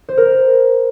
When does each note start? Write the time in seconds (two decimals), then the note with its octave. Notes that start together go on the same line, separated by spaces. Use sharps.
0.09 C5
0.18 A#4